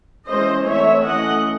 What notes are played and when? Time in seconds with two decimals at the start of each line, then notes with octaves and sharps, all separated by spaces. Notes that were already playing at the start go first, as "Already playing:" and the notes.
0.29 E3 G#3 C#4 C5 D#5
0.67 E3 A3 C4 C#5 E5
1.05 E3 A3 C#4 D#5 F#5